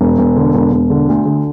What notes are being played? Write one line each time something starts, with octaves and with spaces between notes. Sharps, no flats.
E1
E1
D3
E1
E1
D3
D2
D3